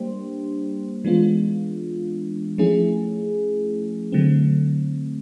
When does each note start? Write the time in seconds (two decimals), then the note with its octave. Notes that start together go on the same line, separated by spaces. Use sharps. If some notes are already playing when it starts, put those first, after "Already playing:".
Already playing: G3 A#3 D4 G4 C5
1.04 E3 G#3 B3 D4 F4
2.58 F3 A3 C#4 E4 G#4
4.12 D3 F#3 A3 C4